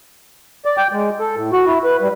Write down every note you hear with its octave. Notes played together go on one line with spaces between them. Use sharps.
D5
G5
G#3
A4
A2
F#4
E4
B4
G3